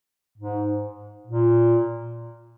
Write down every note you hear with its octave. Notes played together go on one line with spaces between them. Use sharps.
G#2
A#2